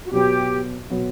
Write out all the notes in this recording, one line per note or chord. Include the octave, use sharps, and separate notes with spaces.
F#4
B2 F#3 B3 G4
B2 F#3 B3